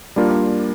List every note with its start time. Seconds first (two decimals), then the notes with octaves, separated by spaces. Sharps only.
0.16 G3 A#3 D4 F4 A#4